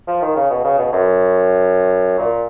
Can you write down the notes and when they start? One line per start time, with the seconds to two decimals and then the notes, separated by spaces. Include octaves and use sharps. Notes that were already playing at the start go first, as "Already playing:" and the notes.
0.08 F3
0.22 D#3
0.36 C#3
0.50 B2
0.65 C#3
0.79 B2
0.93 F#2
2.19 A#2